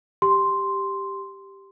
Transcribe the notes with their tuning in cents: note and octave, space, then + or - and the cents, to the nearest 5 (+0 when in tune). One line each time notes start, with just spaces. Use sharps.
G4 +0 C6 +0